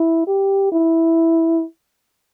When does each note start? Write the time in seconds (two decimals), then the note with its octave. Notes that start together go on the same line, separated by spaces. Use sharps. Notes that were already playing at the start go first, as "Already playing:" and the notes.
Already playing: E4
0.27 G4
0.72 E4